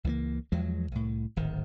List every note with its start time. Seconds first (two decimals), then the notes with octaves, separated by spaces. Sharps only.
0.04 C#2 E3 F3 A#3
0.52 E2 F3 F#3 G#3
0.92 C2 A2
1.36 D1 G#1 D#3